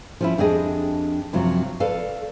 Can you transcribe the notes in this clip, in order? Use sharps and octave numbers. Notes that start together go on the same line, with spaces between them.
F3 C#4 E4
F2 D4 G4 G#4 D#5
F#2 C3 F3 F#3
A4 B4 D5 F5